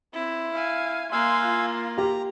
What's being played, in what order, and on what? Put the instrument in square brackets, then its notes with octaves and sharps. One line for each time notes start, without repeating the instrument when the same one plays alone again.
[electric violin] C4 [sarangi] E4
[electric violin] F5 G#5
[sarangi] A#3 [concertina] F5 G#5 E6 [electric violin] C6 F#6
[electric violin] F4
[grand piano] G4 [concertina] A#5